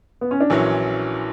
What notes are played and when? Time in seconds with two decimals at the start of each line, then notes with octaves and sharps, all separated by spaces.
0.21 B3
0.31 C#4
0.41 D4
0.50 A#1 A#2 E3 F#3 C#4 E4